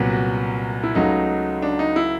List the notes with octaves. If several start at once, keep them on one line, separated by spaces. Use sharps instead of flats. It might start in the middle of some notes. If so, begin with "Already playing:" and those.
Already playing: C2 A#2 F#3 B3
F#4
E4
C#2 C#3 F#3 A3 D#4
D4
D#4
E4